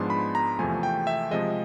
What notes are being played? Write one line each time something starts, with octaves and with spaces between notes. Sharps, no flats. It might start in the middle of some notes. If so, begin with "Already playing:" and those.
Already playing: G#2 F3 G#3 B3 D4 C6
B5
A#5
E2 C3 F3 A3 G#5
G5
E5
C3 F3 G#3 D#5